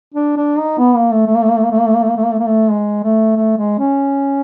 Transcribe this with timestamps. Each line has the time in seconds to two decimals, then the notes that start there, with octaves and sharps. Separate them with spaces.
0.14 D4
0.37 D4
0.58 D#4
0.79 B3
0.96 A#3
1.11 A3
1.27 A3
1.35 A#3
1.42 A3
1.49 A#3
1.57 A3
1.64 A#3
1.71 A3
1.79 A#3
1.87 A3
1.94 A#3
2.02 A3
2.09 A#3
2.17 A3
2.23 A#3
2.31 A3
2.39 A#3
2.46 A3
2.71 G#3
3.03 A3
3.36 A3
3.57 G#3
3.79 C#4